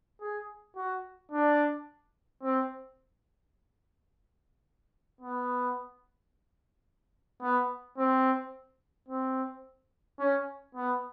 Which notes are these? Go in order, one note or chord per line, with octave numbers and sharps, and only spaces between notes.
G#4
F#4
D4
C4
B3
B3
C4
C4
C#4
B3